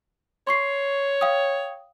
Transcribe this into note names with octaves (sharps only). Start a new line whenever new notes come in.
C#5 C6 C#6 C7
F5 G5 D#6